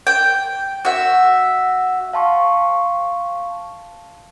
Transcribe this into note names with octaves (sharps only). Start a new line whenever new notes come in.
G5
F#4 E5
F5 A5 C6 C#6